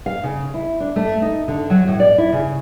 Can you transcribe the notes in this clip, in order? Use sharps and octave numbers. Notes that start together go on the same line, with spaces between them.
F5
C#3
E4
D4
A3
D#4
D3
F#3
A2
D5
E4
C#3